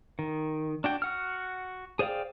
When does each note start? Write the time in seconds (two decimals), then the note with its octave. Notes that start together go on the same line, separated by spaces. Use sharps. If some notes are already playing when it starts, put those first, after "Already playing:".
0.19 D#3
0.84 D4 F#4 G5
1.02 F#4 F#5 F6
1.99 G#4 C5 D5 F5 G5